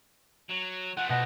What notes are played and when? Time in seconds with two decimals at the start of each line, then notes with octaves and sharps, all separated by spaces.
0.51 F#3
0.97 F3 A3 F#5
1.09 B2 F#5 A#6